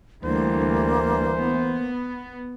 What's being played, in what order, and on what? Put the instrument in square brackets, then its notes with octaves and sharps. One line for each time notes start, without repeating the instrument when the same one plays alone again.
[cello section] D2 G3 [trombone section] E3 [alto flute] A#3 [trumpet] C5
[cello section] B3